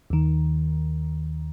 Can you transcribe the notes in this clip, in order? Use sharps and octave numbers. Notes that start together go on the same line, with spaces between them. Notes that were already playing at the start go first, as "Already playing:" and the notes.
D#2 D#3